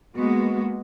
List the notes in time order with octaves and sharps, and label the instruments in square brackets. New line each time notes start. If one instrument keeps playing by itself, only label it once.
[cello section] G#3 A#3 B3 F#4